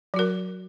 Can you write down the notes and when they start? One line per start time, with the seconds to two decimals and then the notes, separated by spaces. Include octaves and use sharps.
0.14 F#3
0.16 F#4
0.19 A#4